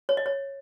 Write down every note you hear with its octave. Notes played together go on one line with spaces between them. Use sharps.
C#5
D#5
C#5